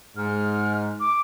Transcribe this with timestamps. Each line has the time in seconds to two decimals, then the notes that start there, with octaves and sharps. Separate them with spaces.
0.17 G#2 F6
1.00 D6